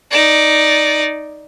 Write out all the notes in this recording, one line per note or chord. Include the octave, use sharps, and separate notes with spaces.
D#4 D5